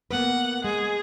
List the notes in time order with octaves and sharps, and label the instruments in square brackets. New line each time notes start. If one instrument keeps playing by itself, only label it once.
[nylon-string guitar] A#3 B3 B4 [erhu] F#5
[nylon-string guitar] G#3 [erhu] G#4